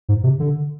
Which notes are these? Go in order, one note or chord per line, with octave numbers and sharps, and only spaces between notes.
G#2
C3
D3